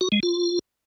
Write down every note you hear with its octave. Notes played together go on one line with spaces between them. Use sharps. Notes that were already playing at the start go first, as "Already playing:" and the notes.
F#4
G#3
F4